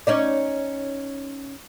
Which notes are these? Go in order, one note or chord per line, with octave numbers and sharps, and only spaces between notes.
C#4 D#4 D5